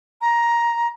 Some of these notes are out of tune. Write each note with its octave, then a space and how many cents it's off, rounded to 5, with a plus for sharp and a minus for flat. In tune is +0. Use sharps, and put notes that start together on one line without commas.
A#5 +10